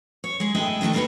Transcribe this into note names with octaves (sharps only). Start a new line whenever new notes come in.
C#5
G#3 G#4
A2 D4 G#4 D#5 E5 G5
A2 D#3 A3 D4 D#4
G3 A#3 E4 F#4 B4 C#5